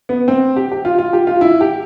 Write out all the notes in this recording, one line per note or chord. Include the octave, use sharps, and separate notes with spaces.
B3
C4
G4
G4
F4
F4
G4
F4
E4
G4